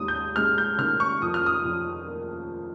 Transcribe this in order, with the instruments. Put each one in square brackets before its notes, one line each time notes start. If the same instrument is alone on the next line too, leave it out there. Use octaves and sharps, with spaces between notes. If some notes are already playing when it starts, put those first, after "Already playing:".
Already playing: [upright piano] D#2 G#3 D#6
G6
G#3 F6
G6
D#3 F6
C#6
F2 D#6
F6
D#6
F2
A#3